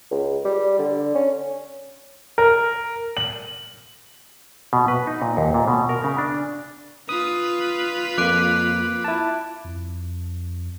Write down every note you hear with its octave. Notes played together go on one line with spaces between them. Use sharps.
C#2
G3
D3
C#4
A#4
F#7
B2
B4
D#4
A#2
D#2
A#2
B2
A#4
C#3
D4
F4 B4 D#6
F2 A#3 D6 F#6 D7
E4 A5
F2